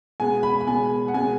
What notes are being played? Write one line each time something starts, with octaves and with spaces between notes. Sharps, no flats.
B2 G#3 B3 G#5
B5
B5
B2 G#3 B3 G#5
F#5
B2 G#3 B3 G#5